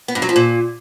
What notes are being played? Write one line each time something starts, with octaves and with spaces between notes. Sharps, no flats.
B3
G2
F#3
F3
A#2